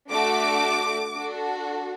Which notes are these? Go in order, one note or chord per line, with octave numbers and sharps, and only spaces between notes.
A3 D4 F#4 A4 D6
D4 F#4 A4